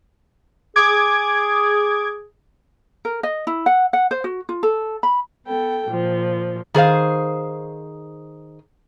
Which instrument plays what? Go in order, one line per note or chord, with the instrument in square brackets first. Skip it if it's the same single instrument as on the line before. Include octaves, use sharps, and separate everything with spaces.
[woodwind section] G#4 [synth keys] D6 G#6
[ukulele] A#4
D#5
E4
F#5
F#5
C5
F#4
F4
A4
B5
[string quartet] B3 A4 G5
A#2 F3
[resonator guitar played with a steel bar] D#3 G#4 C5 F5